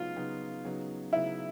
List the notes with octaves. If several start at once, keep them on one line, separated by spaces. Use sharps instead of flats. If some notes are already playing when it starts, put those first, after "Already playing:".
Already playing: C#3 F#3 B3 D#4 F4
C#3 F#3 B3 D#4
C#3 F#3 B3 D#4
C#3 F#3 B3 D#4 E4